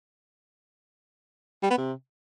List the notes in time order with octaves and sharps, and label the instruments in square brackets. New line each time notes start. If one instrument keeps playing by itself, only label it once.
[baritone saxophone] G3
B3
C3